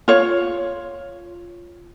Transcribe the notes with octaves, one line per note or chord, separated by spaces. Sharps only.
F4 C#5